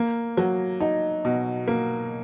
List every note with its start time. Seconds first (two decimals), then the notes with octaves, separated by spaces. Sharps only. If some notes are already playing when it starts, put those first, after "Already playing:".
Already playing: A#3
0.37 F#3
0.80 D#4
1.25 B2
1.68 A#3